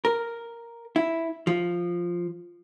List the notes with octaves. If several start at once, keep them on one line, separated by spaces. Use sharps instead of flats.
A#4
E4
F3